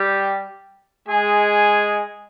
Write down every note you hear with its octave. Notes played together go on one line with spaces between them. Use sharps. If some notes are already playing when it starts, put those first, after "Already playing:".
Already playing: G3 G4
G#3 G#4